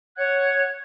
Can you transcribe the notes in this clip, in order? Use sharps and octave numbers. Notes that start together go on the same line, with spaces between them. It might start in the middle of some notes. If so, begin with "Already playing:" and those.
C#5 F#5 F#6 G#6